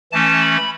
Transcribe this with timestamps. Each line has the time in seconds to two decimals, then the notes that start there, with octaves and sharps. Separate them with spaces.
0.12 E3 A3 C#4 A5
0.41 B5